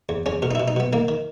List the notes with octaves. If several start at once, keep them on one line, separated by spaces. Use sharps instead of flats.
E2
E2 C#4
B2 A#4
D#4
E4
B2
D#4
B2 B3
D#3 A#3
D#3